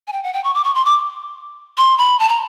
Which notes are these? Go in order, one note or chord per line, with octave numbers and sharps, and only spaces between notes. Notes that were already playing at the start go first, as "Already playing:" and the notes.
G#5
G5
F#5
G5
C#6
D6
C#6
C6
D6
C6
B5
A5
A#5